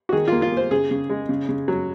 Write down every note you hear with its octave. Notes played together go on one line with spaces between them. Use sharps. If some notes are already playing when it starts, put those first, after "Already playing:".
F#4
D#3 G#4
A#3 F4
F4
A#3 C5
C#3 G#4
C#3
G#3
C#3
C#3
F#3